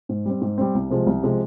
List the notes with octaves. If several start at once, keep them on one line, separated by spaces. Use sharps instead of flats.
G#2
G3 C4
G#2
G3 C4
C2
C3 F3 G#3
C2
C3 F3 G#3